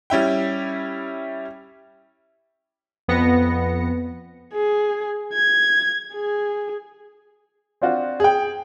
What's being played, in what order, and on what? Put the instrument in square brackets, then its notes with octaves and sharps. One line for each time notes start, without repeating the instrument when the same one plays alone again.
[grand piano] G3 C#4 E4 G5
[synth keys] F2 B3 A#6 C#7
[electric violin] G#4
G#6
G#4
[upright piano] C4 D4 F4 F#4
G#4 G5